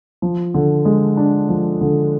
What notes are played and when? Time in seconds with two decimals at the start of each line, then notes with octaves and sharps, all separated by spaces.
0.22 F3
0.54 D3
0.85 G#3
1.17 D4
1.49 F3
1.81 D3